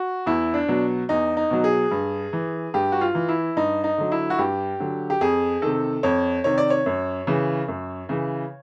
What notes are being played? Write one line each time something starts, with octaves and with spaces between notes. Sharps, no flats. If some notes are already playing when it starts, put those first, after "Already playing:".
Already playing: F#4
E2 E4
D4
B2 F#3
E2 D#4
D#4
B2 F#3
G#4
G2
E3
G2 G4
F#4
F4
E3
E4
G2 D#4
D#4
D3 F#3
E4
F#4
G2 G4
D3 F#3
G4
F2 G#4
C3 D#3 A4
F2 C#5
C3 D#3 C#5
D5
C#5
F#2
C#3 E3
F#2
C#3 E3